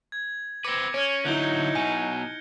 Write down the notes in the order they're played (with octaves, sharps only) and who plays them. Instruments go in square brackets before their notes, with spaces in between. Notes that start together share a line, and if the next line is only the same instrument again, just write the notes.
[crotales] G#6
[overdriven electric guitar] C4 B4 [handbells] D6 [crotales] G#6 A#6 C#7
[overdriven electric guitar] C#4 [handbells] C#5 [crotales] F6 C#7 D7
[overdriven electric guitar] D3 F#3 [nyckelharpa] D#4 E4 [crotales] F#6 G6 G7
[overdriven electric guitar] B2 F#3 [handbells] G#5